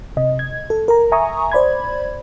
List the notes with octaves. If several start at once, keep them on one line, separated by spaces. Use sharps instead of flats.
C3 D#5
G#6
A4
A#4 A#5
E5 G#5 A#5 C#6 D#6
C5 D5 B5 G#6